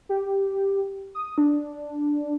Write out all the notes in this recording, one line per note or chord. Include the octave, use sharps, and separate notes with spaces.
G4
D#6
D4